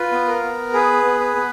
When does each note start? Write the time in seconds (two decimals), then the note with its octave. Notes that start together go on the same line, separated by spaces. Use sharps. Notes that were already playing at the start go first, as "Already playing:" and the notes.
Already playing: F4 B4
0.12 B3
0.28 A#4
0.43 B3
0.73 G#4 B4
1.05 B3
1.20 B4
1.36 B3